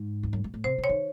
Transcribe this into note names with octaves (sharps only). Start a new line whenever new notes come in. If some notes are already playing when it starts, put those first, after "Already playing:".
Already playing: G#2
E2
F#2
G#2
A2
C3 C5
C#3
C#5
D#3